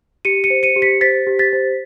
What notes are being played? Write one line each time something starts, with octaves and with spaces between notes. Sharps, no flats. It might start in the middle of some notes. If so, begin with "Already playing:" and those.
G4 C#7 D#7
C#7 D#7
C5
C#7 D#7
G4
B6 C#7
C5 A6 B6
G4
A6 B6
C5